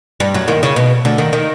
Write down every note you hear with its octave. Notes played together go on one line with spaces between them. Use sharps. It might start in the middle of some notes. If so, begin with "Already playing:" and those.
G2 G3
F#2 F#3
D#2 D#3
C#3
B2
D2 D3
D#2 D#3
D#3